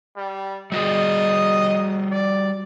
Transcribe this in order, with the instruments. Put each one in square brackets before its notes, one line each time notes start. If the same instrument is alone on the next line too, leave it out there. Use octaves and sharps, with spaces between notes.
[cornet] G3
[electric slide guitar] G3 F#4 G#4 [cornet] D#5
[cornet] D5